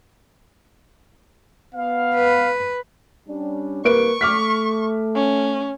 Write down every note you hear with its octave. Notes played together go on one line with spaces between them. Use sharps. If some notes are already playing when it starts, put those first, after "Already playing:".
B3 F5
B4
G3 C#4 D4
C2 A#3 B4 C#6 D7
A3 D6 F6 B6
C#4